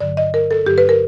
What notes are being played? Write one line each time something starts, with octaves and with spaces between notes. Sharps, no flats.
G2 D3 F#3 D5
D#5
A#4
A4
G2 D3 F#3 G4
B4
A#4